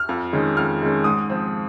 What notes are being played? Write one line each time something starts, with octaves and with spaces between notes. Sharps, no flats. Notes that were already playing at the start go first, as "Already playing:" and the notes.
Already playing: F6
F2
D#3 G#3 C#4
F2 F6
D#3 G#3 C#4
G#2 D#6
F3 C4